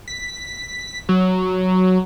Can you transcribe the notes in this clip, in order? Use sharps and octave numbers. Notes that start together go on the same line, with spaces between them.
B6
F#3